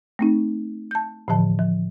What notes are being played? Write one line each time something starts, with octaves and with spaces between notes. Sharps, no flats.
A3 C4 D#4
A5 G6
A2 D3 E3 F3 A5
F3